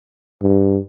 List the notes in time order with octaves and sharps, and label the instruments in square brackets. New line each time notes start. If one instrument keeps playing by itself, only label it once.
[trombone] G2